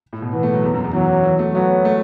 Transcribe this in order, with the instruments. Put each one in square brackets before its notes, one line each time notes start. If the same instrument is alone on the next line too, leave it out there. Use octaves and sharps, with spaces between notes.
[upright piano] A2
B2
[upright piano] E3 [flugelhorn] B3
[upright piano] A3
F#3
E2
F#2
E2
[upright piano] E3 [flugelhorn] F#3
[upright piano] E3
A3
[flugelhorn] F#3 [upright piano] B3
[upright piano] A3